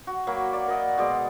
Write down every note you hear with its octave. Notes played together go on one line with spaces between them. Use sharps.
F#4
F#3 A#3 B5
D5
A#4 D5 D#5 F#5
B2 G#3 D5